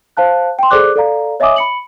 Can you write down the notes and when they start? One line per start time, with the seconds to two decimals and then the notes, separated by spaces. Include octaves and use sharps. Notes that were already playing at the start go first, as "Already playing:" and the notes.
0.17 C5 F5 A5 F#6
0.59 G5 C6
0.71 G#4 A4 C5 D5 D6 F#6
0.96 A4 D5 F5 A#5
1.40 C#5 D#5 E5 G#5 D6 D#6
1.56 B5 C#7 F#7